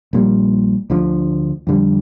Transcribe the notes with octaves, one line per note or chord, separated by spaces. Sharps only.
A#1 A#2 G3
D2 D3 F3
F2 D3 G3